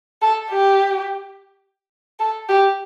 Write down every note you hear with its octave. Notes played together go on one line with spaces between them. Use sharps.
A4
G4
A4
G4